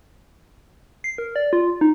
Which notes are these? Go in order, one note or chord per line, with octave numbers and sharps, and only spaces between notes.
C7
A#4
D5
F4
D#4